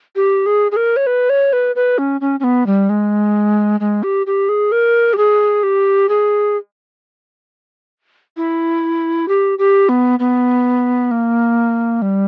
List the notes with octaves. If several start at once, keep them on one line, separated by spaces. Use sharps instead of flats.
G4
G#4
G#4
A#4
C#5
B4
C#5
B4
B4
C#4
C#4
C#4
B3
G3
G#3
G#3
G4
G4
G#4
A#4
G4
G#4
G4
G#4
E4
G4
G4
B3
B3
A#3
G3